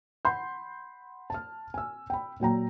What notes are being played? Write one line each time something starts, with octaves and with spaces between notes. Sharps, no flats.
F#5 B5 C6 G6
A5 F6
G#5 E6
G5 B5
A#2 F#3 G5 A#5